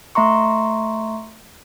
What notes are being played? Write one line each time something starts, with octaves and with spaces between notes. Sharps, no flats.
A3 E5 A#5 C6 C#6